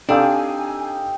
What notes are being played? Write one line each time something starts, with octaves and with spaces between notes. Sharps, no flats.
C4 D4 D#4 G4 A4 F5 G#5